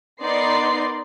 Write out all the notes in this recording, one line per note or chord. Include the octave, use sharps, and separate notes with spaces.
B3 D#4 A#4 D5 C6 C7